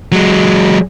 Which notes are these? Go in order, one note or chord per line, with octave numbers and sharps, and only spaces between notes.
F#3 G#3